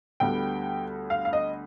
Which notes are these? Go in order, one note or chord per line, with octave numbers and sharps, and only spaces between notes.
D2 D3 G3 B3 G5
F5
F5
D#5